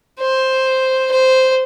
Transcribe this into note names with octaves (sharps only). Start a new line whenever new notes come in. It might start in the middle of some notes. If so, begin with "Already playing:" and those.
C5
C5